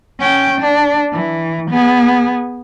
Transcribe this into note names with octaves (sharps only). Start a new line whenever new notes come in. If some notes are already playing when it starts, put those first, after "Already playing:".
C#4 G5
D4
E3
B3 G#4